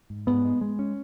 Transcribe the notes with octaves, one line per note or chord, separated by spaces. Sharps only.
G#2
G#2 B3
G#3
G#3
C#4